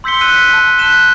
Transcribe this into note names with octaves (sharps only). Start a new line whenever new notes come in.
C6 E6 G6 B6 C#7 G7
E6 F#6 D#7
B6
A5
F#6 G6 B6 E7 G7